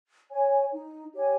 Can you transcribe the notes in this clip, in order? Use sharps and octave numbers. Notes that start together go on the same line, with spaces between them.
C#5 G#5
D#4
G4 C#5 G#5